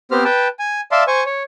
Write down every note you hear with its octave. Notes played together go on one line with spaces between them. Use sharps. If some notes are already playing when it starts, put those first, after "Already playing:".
B3 C4 G4 C5 F6
B4 G5 A5
G#5
D5 E5 F5 A5 C6
C5 G#5 C#6
C#5